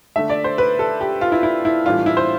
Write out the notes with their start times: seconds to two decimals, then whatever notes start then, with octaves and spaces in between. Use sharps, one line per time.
0.16 D3 A3 D4 E5
0.30 D5
0.44 C5
0.58 B4
0.79 A4
1.01 G4
1.21 F4
1.32 E4
1.43 E4
1.65 E4
1.85 A2 E3 G3 D4 F4
2.06 E4
2.17 C5